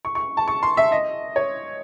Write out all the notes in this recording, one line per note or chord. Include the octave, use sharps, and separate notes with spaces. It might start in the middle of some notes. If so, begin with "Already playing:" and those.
C#6
C#6
A5
C#6
C6
E5
D#5
C#5